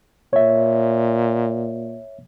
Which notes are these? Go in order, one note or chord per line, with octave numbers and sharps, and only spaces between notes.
A#2 C#5 E5